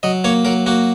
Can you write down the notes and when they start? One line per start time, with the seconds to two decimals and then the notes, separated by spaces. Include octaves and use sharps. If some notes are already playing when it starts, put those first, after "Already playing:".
0.03 F#3 D#5
0.24 A#3 C#5
0.45 F#3 A#4
0.66 A#3 F#4